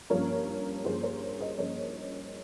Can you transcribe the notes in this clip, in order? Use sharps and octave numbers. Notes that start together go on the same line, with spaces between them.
G2 F3 A#3 C#4 A#4 C#5
G2 F3 A#3 C#4 G#4 C5
A#4 C#5
C5 D#5
G2 F3 A#3 C#4 A#4 C#5